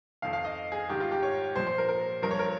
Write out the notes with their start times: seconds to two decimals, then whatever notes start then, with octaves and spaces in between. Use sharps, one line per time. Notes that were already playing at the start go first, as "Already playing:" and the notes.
0.22 F2 D#3 F5
0.33 F5
0.45 D#5
0.72 G#4
0.89 G#2 D#3 G4
1.00 F4
1.12 G4
1.22 C#5
1.56 A#2 F3 C5
1.67 C5
1.78 A#4
1.89 A#4
2.22 G2 F3 A#4
2.31 C#5
2.39 A#4